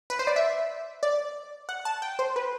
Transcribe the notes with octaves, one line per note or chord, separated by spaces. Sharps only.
B4
C5
D5
E5
D5
F#5
A5
G5
C5
B4